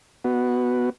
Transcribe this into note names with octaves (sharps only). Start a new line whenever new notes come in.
B3 F#4